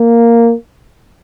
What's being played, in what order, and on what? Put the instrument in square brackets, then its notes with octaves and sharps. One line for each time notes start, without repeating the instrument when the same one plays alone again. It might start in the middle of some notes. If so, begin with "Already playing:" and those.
Already playing: [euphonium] A#3